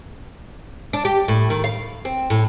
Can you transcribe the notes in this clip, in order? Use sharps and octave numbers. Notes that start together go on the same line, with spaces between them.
D4
G4
A2
D#3
F5
C4
A2